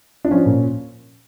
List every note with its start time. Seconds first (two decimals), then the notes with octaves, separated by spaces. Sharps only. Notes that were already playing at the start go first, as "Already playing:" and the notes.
0.25 D4
0.31 F3 C#4
0.46 A#2